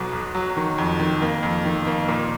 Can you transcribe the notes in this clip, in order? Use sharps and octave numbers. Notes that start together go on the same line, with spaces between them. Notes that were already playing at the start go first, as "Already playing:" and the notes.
Already playing: B1 B2 F#3
B1
F#3
D#3
F2
D#3
A#3
F2
D#3
A#3
A#2